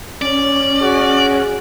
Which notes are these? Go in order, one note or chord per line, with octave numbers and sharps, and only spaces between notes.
C#4 D5
F#4 G#4